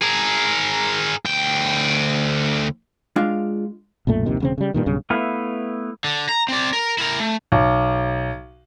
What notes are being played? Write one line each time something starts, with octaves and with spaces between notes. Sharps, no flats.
G#4 A#4
D2 G5
G#3 D4 F4 F5
B1 F#2 A#2 A3
A#1 D#2 C3 D#3
E1 C#3 C4
C#3 G3
G2 A#2 D#3
B1 G2 C#3
A3 B3 E4 B4 F5
D3
A#5
C4 D5
A#4
E4 A#4
A3
B1